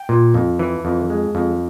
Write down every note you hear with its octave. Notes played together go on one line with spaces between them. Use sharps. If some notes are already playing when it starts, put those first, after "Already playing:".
Already playing: G5
A#2
F2
E3
F2
G#3
F2